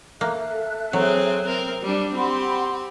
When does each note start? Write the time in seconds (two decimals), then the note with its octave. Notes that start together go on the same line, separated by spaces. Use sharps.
0.21 A#3 A4 E5 F#6
0.93 F#3 C4 G#4
1.47 C4 A#4
1.82 G3 D4
2.15 C4 G4 F#5 B5 C6